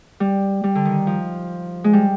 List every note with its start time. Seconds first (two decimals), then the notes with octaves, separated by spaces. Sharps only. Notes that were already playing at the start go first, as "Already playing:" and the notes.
0.20 G3
0.64 G3
0.75 D3
0.85 D#3
1.07 F3
1.84 G#3
1.93 G3